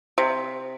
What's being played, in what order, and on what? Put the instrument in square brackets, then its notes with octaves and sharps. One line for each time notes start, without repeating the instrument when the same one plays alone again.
[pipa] C3